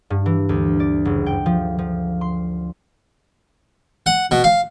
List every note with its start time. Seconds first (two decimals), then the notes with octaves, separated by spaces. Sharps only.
0.10 G2
0.26 E3
0.49 D2
0.80 D5
1.05 F#1
1.26 G5
1.46 F3
1.78 F3
2.21 C6
4.06 F#5
4.31 B2
4.44 F5